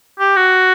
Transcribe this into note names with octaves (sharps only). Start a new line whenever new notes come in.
G4
F#4